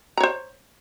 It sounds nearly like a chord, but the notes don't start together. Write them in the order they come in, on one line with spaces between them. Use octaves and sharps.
A#5 C#5 C5